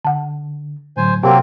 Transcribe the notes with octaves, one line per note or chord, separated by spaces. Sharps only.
D3 F#5 A5
A2 D3 F#3 C5 G#5
C3 F#3 A#3 C4 G4 A5